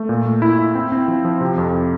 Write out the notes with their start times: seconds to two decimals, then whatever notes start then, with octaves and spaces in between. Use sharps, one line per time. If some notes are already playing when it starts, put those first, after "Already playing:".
Already playing: A3
0.09 A#2
0.25 A3
0.42 E4
0.59 E4
0.75 C4
0.92 C4
1.08 F3
1.25 F3
1.41 C3
1.58 F2